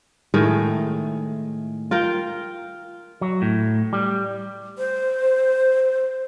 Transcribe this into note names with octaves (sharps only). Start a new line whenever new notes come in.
A2 D#3 G#3 A3
F4 A#4 G5
F#3
A2
G3
C5